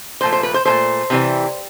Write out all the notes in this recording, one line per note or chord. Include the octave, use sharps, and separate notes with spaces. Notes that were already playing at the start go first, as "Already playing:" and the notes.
A#2 F3 A3 C5
C5
B4
C5
A#2 F3 A3 C5
C3 E3 G3